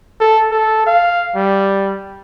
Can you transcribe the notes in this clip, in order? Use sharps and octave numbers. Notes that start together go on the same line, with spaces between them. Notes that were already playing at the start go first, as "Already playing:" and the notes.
A4
A4
F5
G3